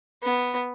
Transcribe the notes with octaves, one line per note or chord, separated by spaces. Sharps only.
B3